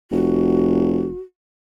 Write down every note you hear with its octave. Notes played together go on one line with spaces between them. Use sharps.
F1 F#4